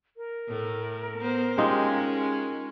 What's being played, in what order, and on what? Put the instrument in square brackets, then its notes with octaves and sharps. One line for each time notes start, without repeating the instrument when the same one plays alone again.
[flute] A#4
[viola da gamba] A2 A3
B3 C5
[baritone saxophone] G#3 [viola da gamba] C#4 [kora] D#4 F4 G4